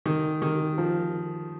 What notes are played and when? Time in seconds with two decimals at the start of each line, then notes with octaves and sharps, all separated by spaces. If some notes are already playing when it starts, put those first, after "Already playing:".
0.06 D#3
0.42 D#3
0.78 F3